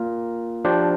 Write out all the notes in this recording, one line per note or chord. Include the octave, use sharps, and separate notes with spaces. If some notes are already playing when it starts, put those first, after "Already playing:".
Already playing: A#3 F4 A#4
F3 D4 G4 C5